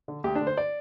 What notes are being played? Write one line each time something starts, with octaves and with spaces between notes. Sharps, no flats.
D3
D2 G4
D4
D3
C5
D5